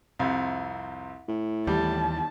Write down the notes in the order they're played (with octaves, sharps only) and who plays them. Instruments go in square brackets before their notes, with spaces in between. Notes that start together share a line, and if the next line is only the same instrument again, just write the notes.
[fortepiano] C2 F2 C3
[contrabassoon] A2
[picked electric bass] D#2 E3 [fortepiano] G3 [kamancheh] A5